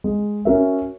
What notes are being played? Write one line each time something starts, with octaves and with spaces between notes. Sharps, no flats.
G#3
C#4 F#4 A#4 E5